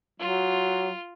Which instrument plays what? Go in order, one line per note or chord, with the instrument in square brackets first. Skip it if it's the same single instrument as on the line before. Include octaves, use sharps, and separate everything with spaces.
[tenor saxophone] F#3 [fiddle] F4